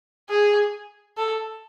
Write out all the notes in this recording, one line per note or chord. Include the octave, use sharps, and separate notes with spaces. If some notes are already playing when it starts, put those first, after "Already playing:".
G#4
A4